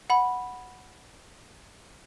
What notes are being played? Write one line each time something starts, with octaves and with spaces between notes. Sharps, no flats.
F#5 B5